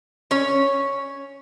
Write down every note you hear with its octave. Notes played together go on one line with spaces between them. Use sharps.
C#4 C#5